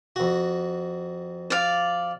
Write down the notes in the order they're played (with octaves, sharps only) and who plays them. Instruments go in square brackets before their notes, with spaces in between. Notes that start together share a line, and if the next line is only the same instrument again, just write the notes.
[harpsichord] F2 F#4
[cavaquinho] D5 F5